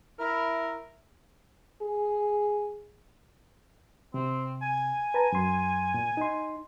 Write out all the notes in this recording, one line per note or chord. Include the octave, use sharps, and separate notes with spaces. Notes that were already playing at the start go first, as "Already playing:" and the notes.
E4 A#4
G#4
C3 C4
G#5
B4 A5 A#5
F#2 C6
A#2
D#4 C6